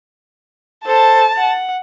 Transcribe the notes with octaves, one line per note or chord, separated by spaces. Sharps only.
A4 C5 A5
F#5